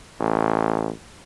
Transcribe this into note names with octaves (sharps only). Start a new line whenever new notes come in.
A1